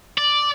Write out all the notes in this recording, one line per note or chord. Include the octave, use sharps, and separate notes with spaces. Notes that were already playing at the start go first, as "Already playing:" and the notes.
D5